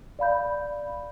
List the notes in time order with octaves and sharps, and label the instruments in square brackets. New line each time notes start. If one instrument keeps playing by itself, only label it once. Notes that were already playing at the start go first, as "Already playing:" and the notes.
[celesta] D5 F5 B5 G6